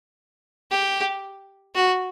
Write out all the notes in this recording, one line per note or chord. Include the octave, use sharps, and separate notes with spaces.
G4
F#4